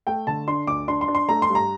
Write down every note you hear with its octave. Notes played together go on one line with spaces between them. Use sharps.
A3 G5
D3 A5
D4 C6
D2 D6
D4 C6
C6
D4
C6
A3 A#5
C6
G2
A#5